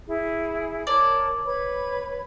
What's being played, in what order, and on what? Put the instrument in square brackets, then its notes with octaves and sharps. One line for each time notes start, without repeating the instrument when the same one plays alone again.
[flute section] E4 G#4
[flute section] A#4 C#5 A5 [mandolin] D5
[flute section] B4 C#5 B5